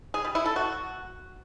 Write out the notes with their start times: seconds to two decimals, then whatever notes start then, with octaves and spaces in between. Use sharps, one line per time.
0.14 G#4
0.25 G3
0.35 E4
0.46 A4
0.56 F#4